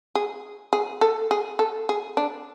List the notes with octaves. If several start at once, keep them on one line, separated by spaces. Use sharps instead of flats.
G#4
G#4
A4
G#4
A4
G#4
D4